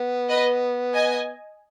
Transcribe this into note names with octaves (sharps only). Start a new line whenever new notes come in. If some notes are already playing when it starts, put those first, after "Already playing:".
Already playing: B3
B4 D#5
D#5 G#5